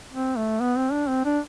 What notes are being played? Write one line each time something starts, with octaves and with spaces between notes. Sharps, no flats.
C4
A3
B3
C4
D4
C4
D4